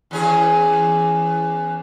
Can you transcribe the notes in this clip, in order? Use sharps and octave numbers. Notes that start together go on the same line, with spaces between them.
E2 C#4 G#4